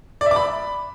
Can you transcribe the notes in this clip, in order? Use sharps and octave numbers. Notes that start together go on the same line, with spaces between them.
D5
E5
D6
B5